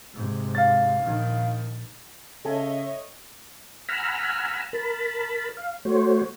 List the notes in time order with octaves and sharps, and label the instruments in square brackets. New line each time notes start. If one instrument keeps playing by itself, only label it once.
[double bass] G#2 C3
[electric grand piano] F5 A6
[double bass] A#1 D#3
[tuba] C#3 [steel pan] A4 G#5 [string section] C#5 D#5 [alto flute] E5
[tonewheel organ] F#5 G#5 A#5 B5 E6 F6
A#4 A5 B5
F5
A3 F#4 C5 C#5